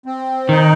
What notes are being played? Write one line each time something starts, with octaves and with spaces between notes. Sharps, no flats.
C4
D#3 D#4